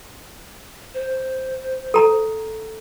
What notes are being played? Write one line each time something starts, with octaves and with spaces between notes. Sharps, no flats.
C5
A4 A#5